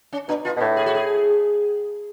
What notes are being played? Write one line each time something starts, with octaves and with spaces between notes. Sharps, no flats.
C#4
B2 D4
B2 F4
B2
A2 F#4
G#4
F#4
G#4